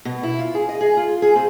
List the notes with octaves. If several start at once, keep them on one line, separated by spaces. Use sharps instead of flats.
B2
E4
F4
G#4
D#5
G#4
F4
G#4
C4